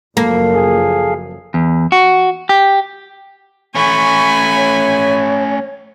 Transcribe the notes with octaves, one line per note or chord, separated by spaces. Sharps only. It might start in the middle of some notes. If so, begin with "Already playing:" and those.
F#1 F#2 F3 A#3 A4 F5
G#4
E2
F#4
G4
A3 C#4 G#5 B5 C#6
C#5